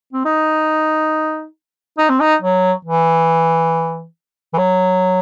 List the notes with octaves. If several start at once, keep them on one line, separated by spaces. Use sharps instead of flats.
C4
D#4
D#4
C4
D#4
F#3
E3
E3
F#3